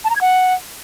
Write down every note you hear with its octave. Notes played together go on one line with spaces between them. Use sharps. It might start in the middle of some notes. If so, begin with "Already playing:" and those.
A5
A#5
G#6
F#5